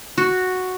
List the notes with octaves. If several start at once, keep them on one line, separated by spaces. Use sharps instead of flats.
F#4